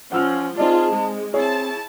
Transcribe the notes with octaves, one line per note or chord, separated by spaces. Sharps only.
F3 C#4 F#5 E6 F6
C4 D#4 F4 G#4 D5 A5
G#3
C4 E4 G#4 C#5 A5